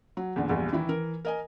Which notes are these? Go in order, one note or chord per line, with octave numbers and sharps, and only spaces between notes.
F#3
E2 A#2 D3
A#1 E2 A#2 G3
D#3 E3 E4
E3 A#4
A#4 D#5 G#5